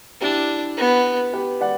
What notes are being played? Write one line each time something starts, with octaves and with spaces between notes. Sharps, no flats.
D4 E4 G4
B3
G4 B4
D5 F#5